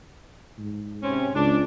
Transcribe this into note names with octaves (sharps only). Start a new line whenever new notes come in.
G#2
C3 C4 C#4
C#2 D4